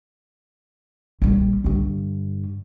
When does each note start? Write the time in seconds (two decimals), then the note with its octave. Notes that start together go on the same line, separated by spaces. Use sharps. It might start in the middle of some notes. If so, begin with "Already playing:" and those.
1.22 A#1 G3
1.64 G2 D3